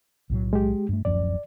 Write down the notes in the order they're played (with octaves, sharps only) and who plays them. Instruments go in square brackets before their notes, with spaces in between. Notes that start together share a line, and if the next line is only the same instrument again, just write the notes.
[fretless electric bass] B1 A2 F#3
[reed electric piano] G#3 G4
[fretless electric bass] G2 A3
[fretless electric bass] D1 F#2 F3 [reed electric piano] D5